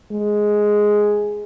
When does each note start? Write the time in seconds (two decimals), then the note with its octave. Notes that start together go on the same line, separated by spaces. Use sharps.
0.12 G#3